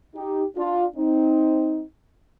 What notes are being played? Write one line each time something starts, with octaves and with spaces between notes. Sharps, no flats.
D#4 G4
D4 F4
C4 D#4